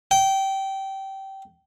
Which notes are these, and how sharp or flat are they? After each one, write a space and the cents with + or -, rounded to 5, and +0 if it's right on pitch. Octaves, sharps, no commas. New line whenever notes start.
G5 -20